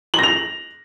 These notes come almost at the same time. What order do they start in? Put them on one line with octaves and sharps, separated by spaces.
F#7 A#6 F7